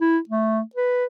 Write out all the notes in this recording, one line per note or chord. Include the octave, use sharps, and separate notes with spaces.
E4
A3
B4